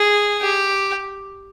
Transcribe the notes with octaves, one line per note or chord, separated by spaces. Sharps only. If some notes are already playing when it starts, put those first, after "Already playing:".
Already playing: G#4
G4